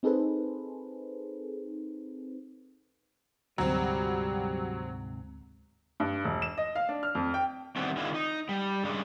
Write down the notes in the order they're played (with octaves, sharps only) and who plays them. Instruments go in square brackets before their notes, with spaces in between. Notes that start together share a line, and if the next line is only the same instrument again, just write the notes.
[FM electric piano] C4 D#4 G#4 A4 B4 C5
[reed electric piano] D2 A#5 [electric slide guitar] G#2 C3 [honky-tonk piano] F#3 C4 [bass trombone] G3
[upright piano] G2
E1
E7
D#5
F5
D4
F6
F2
G5
[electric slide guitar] D#3 E3 G3 B3 C4
D3 D#3 G#3 E4 F4
D#4
G3
G2 C#3 G3 G#3